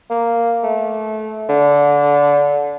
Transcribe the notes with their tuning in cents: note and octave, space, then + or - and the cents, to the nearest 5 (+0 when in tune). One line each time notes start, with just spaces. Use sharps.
A#3 -5
A3 -25
D3 -20